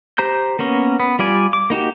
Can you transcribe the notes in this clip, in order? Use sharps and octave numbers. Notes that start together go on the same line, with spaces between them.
G4 C5 A#5 G6
A#3 B3 C#4 A#4
B3
G3 F4 D5 G#5
D6
A#3 D#4 F#4 G4